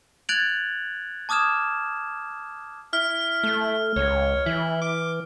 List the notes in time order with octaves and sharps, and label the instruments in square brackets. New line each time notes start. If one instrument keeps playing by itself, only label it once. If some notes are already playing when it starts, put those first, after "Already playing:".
[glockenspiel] F#6 G#6 A6 D7 F7 F#7
A5 D6 D#6 F6 G#6 E7
[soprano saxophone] E4 [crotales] F6
[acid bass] A3
[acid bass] C#2 [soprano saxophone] C#5
[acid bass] E3 [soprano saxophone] E4
[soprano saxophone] D6